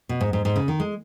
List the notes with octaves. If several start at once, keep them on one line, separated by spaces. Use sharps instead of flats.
B2
G#2
G#2
G#2
C#3
D#3
G#3